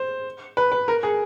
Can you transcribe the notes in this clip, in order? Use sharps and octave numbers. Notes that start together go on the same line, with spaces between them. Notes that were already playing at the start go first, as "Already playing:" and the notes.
Already playing: C5
B4
B4
A#4
G#4